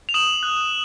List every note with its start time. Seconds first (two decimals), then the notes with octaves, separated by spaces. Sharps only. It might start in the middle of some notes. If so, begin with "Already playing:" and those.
0.09 F7
0.14 D#6 E7 F#7
0.43 F#6